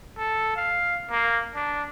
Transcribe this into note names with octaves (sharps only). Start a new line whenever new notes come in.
A4
F5
A#3
D4